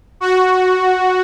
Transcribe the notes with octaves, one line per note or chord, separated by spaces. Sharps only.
F#4